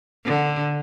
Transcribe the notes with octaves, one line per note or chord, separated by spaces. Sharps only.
D3